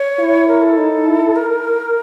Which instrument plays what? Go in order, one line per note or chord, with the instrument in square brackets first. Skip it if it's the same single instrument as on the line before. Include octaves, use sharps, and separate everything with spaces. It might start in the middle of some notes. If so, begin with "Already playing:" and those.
Already playing: [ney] C#5
[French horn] E4
[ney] A#4
A4
[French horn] D#4
E4
[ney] A#4